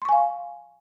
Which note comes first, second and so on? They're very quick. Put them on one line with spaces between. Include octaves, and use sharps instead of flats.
C6 C#6 G#5 F5